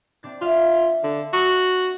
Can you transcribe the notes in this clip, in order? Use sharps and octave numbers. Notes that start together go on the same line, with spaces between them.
C4 D4 A6
F4 E5 F5 F6
D3
F#4